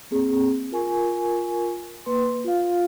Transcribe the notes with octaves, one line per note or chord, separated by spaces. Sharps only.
A#3 C4 G#4
F4 A#4 G#5 C#6
A#3 B4 C6
F4 F5